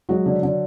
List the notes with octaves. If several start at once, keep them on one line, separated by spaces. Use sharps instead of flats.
F#3 G#3 F#4
D3
D3